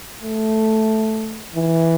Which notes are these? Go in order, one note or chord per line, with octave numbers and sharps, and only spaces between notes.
A3
E3